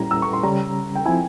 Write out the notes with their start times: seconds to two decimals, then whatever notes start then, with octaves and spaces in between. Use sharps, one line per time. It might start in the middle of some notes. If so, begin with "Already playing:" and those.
Already playing: A#2 G3 C#4 E4 A#5
0.11 E6
0.22 C#6
0.33 C6
0.43 C#3 G3 C#4 A#5
0.95 G5
1.06 F3 C4 E4 G#5